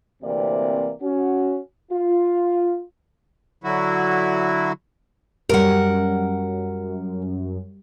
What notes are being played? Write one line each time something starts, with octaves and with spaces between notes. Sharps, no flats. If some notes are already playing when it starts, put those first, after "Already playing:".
D2 C3 E3 A#3 C4 D5
C#4 F#4
F4
D3 F#3 E4 F#4
F#2 G3 G4 A#4 F#5